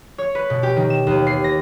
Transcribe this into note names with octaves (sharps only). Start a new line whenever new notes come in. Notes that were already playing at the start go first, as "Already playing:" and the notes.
C#5
B4
B2
G4
D#3
E7
D#2
C7
A#6